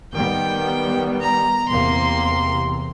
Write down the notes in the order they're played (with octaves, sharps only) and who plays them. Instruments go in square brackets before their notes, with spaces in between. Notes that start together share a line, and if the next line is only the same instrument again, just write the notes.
[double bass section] D#3 G3 B3 [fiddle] G5
[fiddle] A#5
[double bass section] E2 C3 [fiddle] A#3 C6